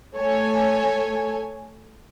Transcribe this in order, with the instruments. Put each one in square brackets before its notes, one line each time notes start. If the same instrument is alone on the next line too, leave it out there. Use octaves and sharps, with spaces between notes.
[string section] A3 A4 C#5 G#5